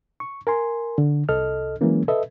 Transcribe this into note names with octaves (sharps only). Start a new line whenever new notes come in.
C#6
A#4 G#5 C6
D3
C2 A4 D#5 F6
E3 F#3 G#3 A#3 C#4
A4 B4 D#5 E5